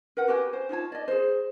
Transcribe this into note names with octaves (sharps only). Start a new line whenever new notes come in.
A#4 B4 F#5
F#4 G4 B4 G#5
C5
D#4 F4 C#5 A5
D5 D#5
G#4 C5